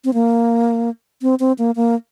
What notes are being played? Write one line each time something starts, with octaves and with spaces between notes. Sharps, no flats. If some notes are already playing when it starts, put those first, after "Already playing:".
C4
A#3
C4
C4
A#3
A#3